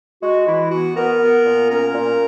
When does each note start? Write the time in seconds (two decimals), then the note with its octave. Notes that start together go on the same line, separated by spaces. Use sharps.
0.23 G#3 F#4
0.47 E3 E4
0.71 B3 F#4
0.97 B3 A#4
1.22 B3
1.45 A#2
1.70 C#4 A#4
1.95 A#2